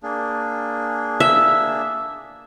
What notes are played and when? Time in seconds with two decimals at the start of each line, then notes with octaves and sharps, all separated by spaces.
0.03 A#3 D4 G#4
1.20 E5